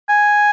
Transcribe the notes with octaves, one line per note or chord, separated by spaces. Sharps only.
G#5